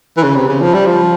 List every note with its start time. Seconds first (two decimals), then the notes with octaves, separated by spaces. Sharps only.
0.17 E3
0.23 C#3
0.36 C3
0.48 C#3
0.61 F3
0.74 G3
0.86 F3